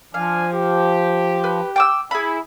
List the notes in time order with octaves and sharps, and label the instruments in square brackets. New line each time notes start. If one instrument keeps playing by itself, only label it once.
[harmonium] F3 [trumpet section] D4 D5 G#5 [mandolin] F5
[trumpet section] G4
[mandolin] B4
G5 D6 E6
[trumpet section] E4 [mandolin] G#4 B5